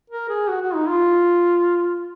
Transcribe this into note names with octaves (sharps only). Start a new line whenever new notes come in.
A#4
G#4
F#4
F#4
D#4
F4